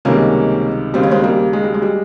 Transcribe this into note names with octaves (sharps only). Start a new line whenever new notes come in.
C#2 C3 D#3 G3 A#3 C#4
D#2 C#3 G3 C4
C#4
G#3 C4
G3 A#3
G#3
G3
G#3
G3